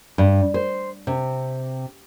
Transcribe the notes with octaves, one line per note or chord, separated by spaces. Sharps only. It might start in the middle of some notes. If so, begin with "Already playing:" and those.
G2
C5
C3